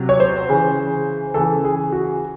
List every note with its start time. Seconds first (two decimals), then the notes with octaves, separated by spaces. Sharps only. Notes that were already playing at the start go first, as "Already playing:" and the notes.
Already playing: C3 F#3
0.09 C#5
0.20 C5
0.49 C#3 E3
1.34 C#3 E3 A4
1.64 G#4
1.92 F#4